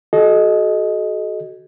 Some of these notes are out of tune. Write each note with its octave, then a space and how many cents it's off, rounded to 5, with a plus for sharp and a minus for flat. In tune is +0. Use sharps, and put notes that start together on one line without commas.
F#4 +15 A4 -35 D#5 +0